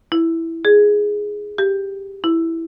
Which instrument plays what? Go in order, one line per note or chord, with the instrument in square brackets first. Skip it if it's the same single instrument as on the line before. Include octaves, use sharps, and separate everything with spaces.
[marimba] E4
G#4
G4
E4